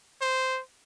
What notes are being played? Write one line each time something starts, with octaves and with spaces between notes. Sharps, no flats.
C5